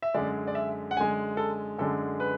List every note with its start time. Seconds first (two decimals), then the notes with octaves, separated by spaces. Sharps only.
0.02 E5
0.14 F#2 D3 G#3 D5
0.47 D5
0.55 E5
0.91 F#5
0.97 F#2 D3 G#3 G#5
1.37 A4
1.78 F#2 D3 G#3 A4
2.20 B4